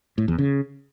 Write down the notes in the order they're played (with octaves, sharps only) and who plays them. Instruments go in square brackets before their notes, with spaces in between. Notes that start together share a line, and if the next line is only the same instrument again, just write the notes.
[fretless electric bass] A2
E2
C#3